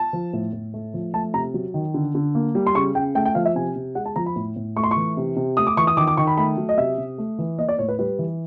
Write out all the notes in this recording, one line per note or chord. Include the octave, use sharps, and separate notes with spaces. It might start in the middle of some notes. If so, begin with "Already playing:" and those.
Already playing: A5
F3
A2
A2
A3
F3
A3 A5
C3 A#5
F#3
D#3
D3
D3
A#3
G3
C6
C#3 C#6
C#3 G5
A3 G5
G5
F3 F5
E5
C3 G#5
C3
G#3 F#5
A5
F3 A#5
B5
A2
A2
A3 C#6
C6
C#6
E3
C3
C3
A3 D#6
D6
E3 C#6
D#6
D#3 D6
D6
D#3 C#6
B5
A3 B5
F#3
D#5
C3 E5
C3
A3
E3
A#3 D#5
D5
A2 C#5
B4
G3 B4
E3